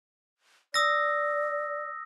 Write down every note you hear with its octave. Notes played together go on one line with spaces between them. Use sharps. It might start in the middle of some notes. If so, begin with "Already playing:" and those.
D5 D#6 E6 A#6